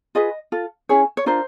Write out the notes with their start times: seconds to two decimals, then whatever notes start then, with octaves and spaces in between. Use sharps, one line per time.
0.15 F4 G#4 B4 D#5
0.52 F4 A4
0.89 C#4 E4 G#4 C#5
1.17 C#5
1.26 D4 F4 A#4 C5